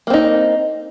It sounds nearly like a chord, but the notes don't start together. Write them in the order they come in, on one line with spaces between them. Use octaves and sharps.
A#3 C4 D#4